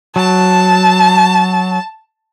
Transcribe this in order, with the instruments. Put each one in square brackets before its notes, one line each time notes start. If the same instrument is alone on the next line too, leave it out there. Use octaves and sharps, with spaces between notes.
[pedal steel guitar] F#3 [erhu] A5